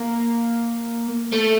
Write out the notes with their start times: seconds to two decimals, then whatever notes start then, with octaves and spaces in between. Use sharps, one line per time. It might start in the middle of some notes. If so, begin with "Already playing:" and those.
Already playing: A#3
1.33 A3